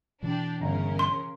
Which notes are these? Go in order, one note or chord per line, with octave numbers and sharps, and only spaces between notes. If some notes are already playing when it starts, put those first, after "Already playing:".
B2 E3 D4 G4
G1 C#3 C#4 A#4 A#5
C6